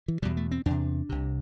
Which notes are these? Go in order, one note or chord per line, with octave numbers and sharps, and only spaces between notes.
E3
E2 B2 G3
A3
C4
E2 C3 D4
C2 C3